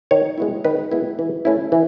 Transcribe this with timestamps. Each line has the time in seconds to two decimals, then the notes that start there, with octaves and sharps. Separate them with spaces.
0.11 D#3 C#5
0.38 G#3 B3 E4
0.64 D#3 B4
0.91 G#3 B3 E4
1.19 E3
1.45 A3 C#4 E4
1.72 E3